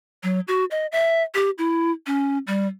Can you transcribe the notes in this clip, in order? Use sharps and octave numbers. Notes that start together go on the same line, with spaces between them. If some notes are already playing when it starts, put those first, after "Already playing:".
F#3
F#4
D#5
E5
G4
E4
C#4
G3